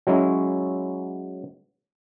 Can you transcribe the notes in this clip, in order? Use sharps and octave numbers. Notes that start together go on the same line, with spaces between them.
F#3 G#3 C#4 E4